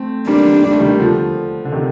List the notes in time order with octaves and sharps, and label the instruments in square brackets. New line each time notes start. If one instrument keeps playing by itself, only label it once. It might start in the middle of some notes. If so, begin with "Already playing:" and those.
Already playing: [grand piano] A3 C4
[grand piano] G3 A#3 [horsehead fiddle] D4
[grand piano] G3
A3
D#3 G3
D3 F3
D3
C3 D#3